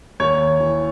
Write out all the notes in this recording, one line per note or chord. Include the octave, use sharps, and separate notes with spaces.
D#2 C#5
E3